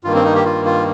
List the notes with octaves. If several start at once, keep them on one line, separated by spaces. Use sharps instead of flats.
G2 D#3 A#3 F4
C4
D#4
G4
F4
F4